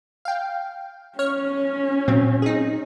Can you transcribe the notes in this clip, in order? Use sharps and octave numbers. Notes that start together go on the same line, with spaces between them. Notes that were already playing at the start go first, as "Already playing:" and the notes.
F5 G5
C#4 C#5 F6
A#2 F#3 C4
D#4 G#4